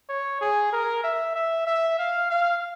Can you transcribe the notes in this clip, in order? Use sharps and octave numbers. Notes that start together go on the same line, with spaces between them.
C#5
G#4
A#4
E5
E5
E5
F5
F5